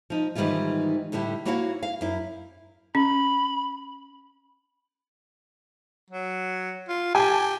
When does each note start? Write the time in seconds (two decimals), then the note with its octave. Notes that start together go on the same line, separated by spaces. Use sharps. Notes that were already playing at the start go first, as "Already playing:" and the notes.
0.10 F3 D#4
0.35 G#2 D#3 E3 G3 E4 F4
1.12 A2 D3 G3 E4 G4
1.45 A#3 E4 F#4 C#5 F5 F#5
1.83 F5
2.01 F#2 E4
2.95 C#4 B5
6.10 F#3
6.89 F4
7.15 G4 G#5 A5